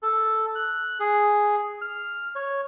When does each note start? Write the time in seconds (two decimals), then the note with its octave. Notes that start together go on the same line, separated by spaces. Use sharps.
0.03 A4
0.55 F#6
1.00 G#4
1.82 F6
2.35 C#5